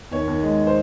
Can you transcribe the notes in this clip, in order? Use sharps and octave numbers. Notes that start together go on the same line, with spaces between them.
D#2 C#5
D#2
G#3
C5